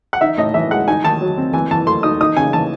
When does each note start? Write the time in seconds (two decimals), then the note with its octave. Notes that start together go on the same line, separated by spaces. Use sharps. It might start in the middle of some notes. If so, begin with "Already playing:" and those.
0.13 F#5
0.21 D#4 E5
0.38 A2 D#5
0.54 E3 E5
0.71 G#3 F#5
0.88 D#4 G#5
1.04 D#3 A5
1.21 F#3
1.38 C4
1.54 E3 G#5
1.71 E3 A5
1.87 A3 C6
2.03 D#4 D#6
2.21 D#4 D#6
2.37 C#3 G#5
2.53 E3 A5